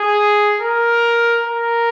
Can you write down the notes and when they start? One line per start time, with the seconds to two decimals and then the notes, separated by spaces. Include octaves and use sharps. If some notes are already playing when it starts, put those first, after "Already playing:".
Already playing: G#4
0.60 A#4
1.47 A#4